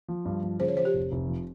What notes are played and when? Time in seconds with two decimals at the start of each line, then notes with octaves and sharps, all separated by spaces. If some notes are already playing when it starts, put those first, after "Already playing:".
0.08 F3
0.25 G2
0.43 F3
0.60 C#3 C5
0.68 C#5
0.77 F3 C5
0.85 G4
0.94 F1
1.12 F1
1.28 F3